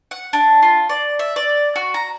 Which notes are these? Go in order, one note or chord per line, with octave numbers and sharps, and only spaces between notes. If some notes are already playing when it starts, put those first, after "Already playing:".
F#5
D4
F4
D5
E5
D5
F#4
A#5